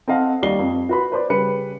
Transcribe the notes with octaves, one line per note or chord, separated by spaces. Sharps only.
C4 A4 D#5 F5 F#5
D#2 G3 D5 D#5 C7 G7
F2
F#4 B4 B5
B4 C5 D5
C#3 G3 B4 C#7